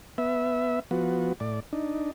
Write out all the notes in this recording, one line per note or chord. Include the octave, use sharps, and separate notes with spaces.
B3 E5
F3 B3 F#4
A2 D5
D4 D#4